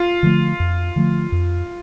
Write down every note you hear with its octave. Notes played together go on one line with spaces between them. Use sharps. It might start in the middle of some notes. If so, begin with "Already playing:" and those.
Already playing: F4
D3 F3 A3
F2
D3 F3 A3
F2